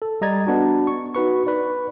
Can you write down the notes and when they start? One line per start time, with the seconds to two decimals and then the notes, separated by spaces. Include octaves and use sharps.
0.02 A4
0.21 G3 D#5 A#5 G#6 A6
0.47 B3 D4 F#4
0.87 C#6
1.15 D#4 F#4 B4 C#6
1.47 B4 D5